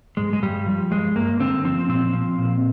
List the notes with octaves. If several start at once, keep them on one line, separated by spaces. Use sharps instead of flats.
G#2 G#3
G#3
G2 G3
F3
G2 G#3
G2 A#3
D3 C4
F3 C4
A#2 C4
F3
A#2